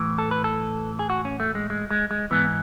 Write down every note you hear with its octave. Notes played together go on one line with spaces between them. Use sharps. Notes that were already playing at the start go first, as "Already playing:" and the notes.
Already playing: A2 E3
A4
B4
A4
G#4
F#4
C#4
A3
G#3
G#3
G#3
G#3
G#2 E3 B3